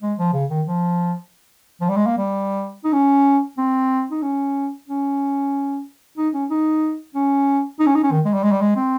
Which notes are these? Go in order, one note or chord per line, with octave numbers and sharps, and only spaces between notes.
G#3
F3
C#3
D#3
F3
F3
G3
G#3
A#3
G3
D#4
C#4
C4
D#4
C#4
C#4
D#4
C#4
D#4
C#4
D#4
C#4
D#4
C#4
D#3
G#3
G3
G#3
G3
G#3
C4